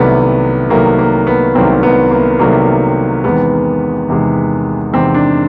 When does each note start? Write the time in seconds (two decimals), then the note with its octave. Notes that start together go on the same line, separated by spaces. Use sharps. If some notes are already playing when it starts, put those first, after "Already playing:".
Already playing: C2 C3 D#3 F#3 A3 B3
0.70 C2 C3 D#3 F#3 A3 A#3
0.99 A#3
1.27 B3
1.55 C2 C3 D#3 F#3 A3 C4
1.83 B3
2.11 A#3
2.39 C2 C3 D#3 F#3 A3 A#3
3.24 E2 C3 D#3 G#3 B3
4.08 E2 C3 D#3 G#3
4.93 E2 C3 D#3 G#3 C4
5.14 D4